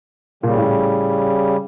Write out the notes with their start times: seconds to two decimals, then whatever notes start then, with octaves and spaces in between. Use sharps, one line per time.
0.43 A#2 C#3 G3
0.57 A2